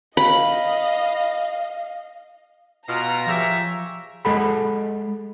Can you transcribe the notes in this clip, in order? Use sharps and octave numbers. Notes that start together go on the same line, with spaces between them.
D#5 F5 B5
B2 F4 A#5
F3 G4 G#4 C#5 E5
G#3 G#4 A4 F#5 B5